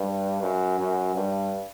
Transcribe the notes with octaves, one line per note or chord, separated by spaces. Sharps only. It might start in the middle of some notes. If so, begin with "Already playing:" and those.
Already playing: G2
F#2
F#2
G2